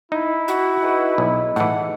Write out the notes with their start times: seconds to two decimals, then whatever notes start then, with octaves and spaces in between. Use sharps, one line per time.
0.12 D#4 E4
0.48 F#4
0.82 D#4 G#4 B4
1.18 B1
1.56 A2 E3 F#5